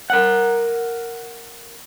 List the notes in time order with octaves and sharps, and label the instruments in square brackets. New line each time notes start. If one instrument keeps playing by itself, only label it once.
[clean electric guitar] A#4 F#5